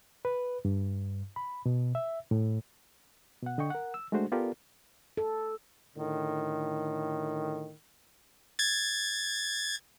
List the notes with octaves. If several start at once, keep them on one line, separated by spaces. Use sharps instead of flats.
B4
G2
B5
B2
E5
A2
B2 F#5
D3 D#5 G5 C#6
A#4 F#5
E6
G#3 A3 D4 F#4 C5
B3 F4 G4 A4 A#4 D5
A4
A2 D3 D#3
G#6 A6